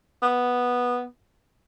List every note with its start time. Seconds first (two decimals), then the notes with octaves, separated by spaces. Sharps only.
0.23 B3